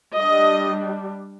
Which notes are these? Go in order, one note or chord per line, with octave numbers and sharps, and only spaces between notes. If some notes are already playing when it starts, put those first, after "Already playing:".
G3 D4 D#5